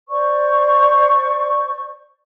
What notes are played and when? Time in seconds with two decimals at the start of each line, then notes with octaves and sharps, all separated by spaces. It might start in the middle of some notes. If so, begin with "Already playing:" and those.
0.09 C5 D5 C#6